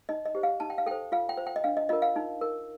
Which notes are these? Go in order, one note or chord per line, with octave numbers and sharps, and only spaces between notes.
D#4 D#5
D#5
G4 C5
F5
D#4 A5
G5
F5
A4 C5 G5
F4 F5
G5
C5
G5
D#5
D4 F5
D#5
F4 A#4 D#5
F5
D#4
A#4